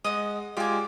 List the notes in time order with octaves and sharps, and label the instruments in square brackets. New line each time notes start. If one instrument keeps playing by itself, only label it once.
[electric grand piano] G#3 [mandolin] D#5 F#5
[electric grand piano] G#3 F4 G4 [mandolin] D5 G#5